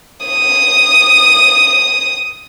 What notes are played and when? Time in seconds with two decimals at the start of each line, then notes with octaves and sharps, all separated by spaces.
0.26 D#6